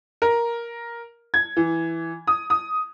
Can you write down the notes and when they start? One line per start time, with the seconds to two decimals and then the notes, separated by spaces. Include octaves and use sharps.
0.22 A#4
1.34 G#6
1.57 E3
2.27 D#6
2.50 D#6